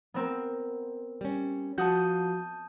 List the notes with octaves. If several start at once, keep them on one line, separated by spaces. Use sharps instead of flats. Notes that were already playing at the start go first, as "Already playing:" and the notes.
B3 C4 A#4
G3 C#4
F3 F#4 F#5 A5 D#6 G6